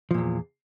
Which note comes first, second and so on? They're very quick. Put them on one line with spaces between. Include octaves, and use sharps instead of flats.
F3 A#2 E2